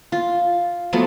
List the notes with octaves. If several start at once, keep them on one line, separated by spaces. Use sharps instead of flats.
F4
F3 F#3 A3 B3